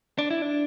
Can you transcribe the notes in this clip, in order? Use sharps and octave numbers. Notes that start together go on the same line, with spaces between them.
D4
E4
D4